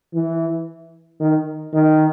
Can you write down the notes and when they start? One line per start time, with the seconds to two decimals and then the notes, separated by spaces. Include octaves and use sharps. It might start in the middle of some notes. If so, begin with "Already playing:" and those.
0.14 E3
1.20 D#3
1.73 D#3